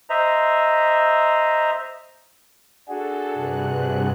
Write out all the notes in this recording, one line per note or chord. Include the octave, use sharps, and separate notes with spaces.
C5 D#5 E5 A#5
D4 F#4 G#4 A4
G2 C3 F#6